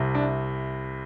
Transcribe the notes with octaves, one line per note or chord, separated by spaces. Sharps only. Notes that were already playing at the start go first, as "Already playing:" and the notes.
Already playing: C2 C3
D4